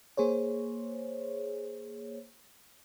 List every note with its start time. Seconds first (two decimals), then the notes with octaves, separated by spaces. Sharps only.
0.17 A#3 G#4 C5 C#5